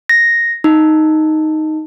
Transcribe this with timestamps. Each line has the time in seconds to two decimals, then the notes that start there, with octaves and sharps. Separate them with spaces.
0.09 A#6
0.64 D#4